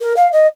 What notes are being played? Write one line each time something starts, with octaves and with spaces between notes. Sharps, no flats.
A#4
F5
D#5